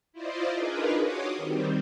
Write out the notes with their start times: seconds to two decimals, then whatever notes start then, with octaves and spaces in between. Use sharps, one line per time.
0.13 E4 F4 C5 D5 D#5
0.52 D4 D#4 F4 G#4 A#4 B4
0.98 F#4 C#5 C6 D6 D#6
1.37 D#3 G3 C4